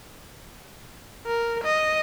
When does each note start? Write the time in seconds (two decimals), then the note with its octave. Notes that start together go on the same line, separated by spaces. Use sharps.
1.27 A#4
1.64 D#5